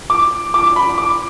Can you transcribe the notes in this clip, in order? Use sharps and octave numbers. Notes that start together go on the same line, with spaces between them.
D6
D6
B5
D6